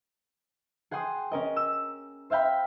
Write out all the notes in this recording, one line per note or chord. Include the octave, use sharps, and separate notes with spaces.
G#4 F#5 G5 C6 D#6
C#4 A#4 D#5
E6
C5 E5 F5 G5 B5